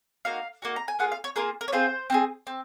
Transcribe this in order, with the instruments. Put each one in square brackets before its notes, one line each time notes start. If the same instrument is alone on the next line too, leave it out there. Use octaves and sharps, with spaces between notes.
[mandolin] A#3 D#4 F#4 F5
A#3 D#4 F#4
A#5
G#5
A#3 F4 G#4 F#5
F5
C#5
A#3 F4 G#4 A#4
A#4
C#5
C4 F4 G#4 C5
C4 F4 G#4
C4